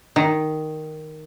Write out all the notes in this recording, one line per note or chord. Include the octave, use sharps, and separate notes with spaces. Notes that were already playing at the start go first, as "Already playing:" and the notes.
D#3